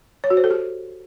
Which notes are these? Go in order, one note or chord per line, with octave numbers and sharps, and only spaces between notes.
C#5
F#4
C5
A4
G4